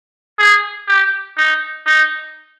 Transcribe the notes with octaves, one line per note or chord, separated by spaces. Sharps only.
G#4
G4
D#4
D#4